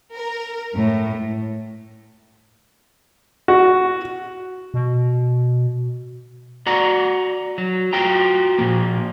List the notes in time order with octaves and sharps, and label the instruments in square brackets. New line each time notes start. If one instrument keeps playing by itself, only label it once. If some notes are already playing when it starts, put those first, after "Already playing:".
[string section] A#4
A2
[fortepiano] F#4
[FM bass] B2
[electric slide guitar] F#4 D5 F#5 A#5
F#3
F4 F#4 G5 A#5
A#2 F3 A#3